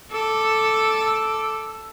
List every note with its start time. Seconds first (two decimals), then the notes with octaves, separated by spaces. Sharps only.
0.12 A4 D6 E6